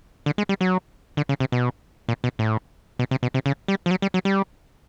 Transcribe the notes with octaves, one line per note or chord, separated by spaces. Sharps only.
D3
G#3
G3
F#3
D3
C#3
C3
B2
A#2
B2
A2
B2
C3
B2
C3
C#3
G3
F3
F#3
G3
F#3
G3